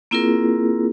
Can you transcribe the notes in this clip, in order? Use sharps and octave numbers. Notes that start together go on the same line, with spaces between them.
A#3 C4 E4 F4 G#4 A#4